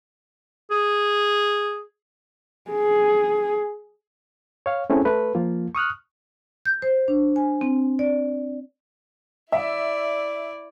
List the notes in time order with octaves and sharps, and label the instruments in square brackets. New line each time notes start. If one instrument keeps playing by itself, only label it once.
[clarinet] G#4
[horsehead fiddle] G#4
[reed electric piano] C#5 F5
A3 C4 C#4 E4 G#4
A3 B4
F3 A#3 F4
C#6 D#6 F6 F#6
[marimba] G6
C5
D4
G#5
C4
D5
[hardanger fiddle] E4 D5 [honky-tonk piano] E5